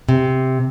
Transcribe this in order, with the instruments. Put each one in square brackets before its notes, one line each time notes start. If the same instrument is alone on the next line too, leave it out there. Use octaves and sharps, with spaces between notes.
[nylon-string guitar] C3